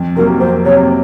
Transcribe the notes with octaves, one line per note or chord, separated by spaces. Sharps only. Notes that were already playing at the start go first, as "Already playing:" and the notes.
Already playing: F2
C3 F#3 A#3 A#4
F2 C5
C3 F#3 A#3 C#5